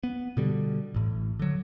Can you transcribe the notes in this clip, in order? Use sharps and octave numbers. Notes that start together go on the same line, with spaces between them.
B3
B2 D3 G3
A1 A2
D3 F#3